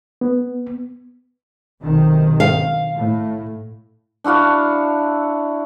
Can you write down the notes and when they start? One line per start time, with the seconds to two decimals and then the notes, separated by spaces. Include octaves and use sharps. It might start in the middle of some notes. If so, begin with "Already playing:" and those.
0.21 B3
1.82 B1 C3 D#3
2.40 F5
2.95 A2
4.24 D4 E4 F#4 F5